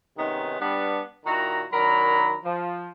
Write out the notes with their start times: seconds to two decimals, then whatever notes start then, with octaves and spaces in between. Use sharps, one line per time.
0.18 C3 D#3 G#3 B3 C#4 D#4
0.60 G3 B3 D4
1.26 A#2 D#3 E4 F#4 A#5
1.73 D#3 F#3 D4 A#4 A#5 B5
2.44 F3